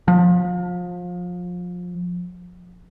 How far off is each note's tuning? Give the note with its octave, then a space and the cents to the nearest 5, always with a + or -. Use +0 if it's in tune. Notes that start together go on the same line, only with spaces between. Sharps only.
F3 +30